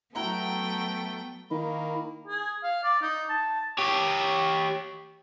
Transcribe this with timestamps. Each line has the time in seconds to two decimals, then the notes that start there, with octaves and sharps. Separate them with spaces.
0.15 F#3 A3 B3 E4 F#4 G5 A#5
1.51 D#3 A#3 E4
2.27 G#4
2.63 F5
2.84 D5
3.02 D#4
3.29 A5
3.79 G4 C#5